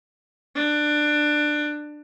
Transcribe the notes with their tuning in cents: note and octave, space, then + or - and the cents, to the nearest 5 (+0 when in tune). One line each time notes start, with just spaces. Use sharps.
D4 +20